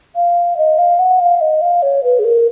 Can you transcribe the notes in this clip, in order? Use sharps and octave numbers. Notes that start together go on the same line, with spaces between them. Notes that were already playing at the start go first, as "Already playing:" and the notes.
F5
D#5
F5
F#5
F5
D#5
F5
C#5
B4
G#4
A#4